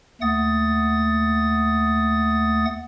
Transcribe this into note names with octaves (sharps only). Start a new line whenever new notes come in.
D#2 A3 F#5 D#6 A6